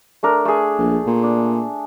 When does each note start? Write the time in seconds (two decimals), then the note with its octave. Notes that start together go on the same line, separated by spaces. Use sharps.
0.23 A3 D4 A#4
0.45 A3 G#4
0.78 A#1
1.06 A#2
1.23 D4